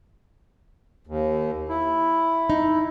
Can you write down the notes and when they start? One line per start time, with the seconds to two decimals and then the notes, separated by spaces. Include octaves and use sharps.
1.07 D#2
1.69 E4
2.50 D#4